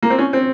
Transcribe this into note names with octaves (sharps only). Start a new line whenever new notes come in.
A#3
C4
C#4
C4